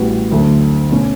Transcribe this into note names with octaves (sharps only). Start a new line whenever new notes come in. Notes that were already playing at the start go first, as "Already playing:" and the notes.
Already playing: A1 A2 G3 B3 F#4
D2 D3 F#3 A3
B2 A3 C#4